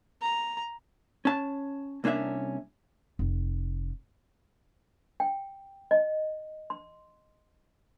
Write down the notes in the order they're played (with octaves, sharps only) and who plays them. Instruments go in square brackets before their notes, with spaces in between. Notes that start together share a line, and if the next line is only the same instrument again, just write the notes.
[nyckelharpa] A#5
[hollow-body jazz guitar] C#4 A5
C2 A#3 C#4 D4 E5
[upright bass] F1
[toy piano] G5
D#5
C6